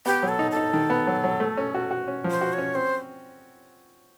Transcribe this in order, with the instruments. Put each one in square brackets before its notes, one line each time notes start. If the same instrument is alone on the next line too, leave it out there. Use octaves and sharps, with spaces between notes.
[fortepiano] B3 [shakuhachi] G4
[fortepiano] F#3
[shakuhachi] A4
[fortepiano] D#4
[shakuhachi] A4
[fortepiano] D#4
D#3
B3
F#3
F#3
A3
C#4
F#4
F#4
C#4
F3
[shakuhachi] C5
[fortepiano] F#4
[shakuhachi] C#5
[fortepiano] C#4
[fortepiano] C4 [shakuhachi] C5